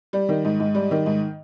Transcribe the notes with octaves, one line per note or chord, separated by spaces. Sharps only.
G3
D#3
G#2
G#2
G3
D#3
G#2